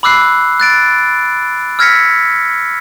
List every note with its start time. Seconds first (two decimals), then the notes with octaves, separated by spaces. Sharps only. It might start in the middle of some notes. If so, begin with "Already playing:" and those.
0.03 B5 D6 E6 F#6 C7
0.60 F#6 A6 D7
1.79 E6 F6 G#6 A#6 B6 C#7